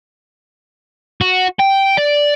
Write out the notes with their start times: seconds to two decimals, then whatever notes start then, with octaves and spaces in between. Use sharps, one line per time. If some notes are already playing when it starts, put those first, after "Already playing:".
1.21 F#4
1.60 G5
1.98 D5